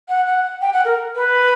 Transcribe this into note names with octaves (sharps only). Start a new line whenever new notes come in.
F#5
F#5
G5
F#5
A#4
B4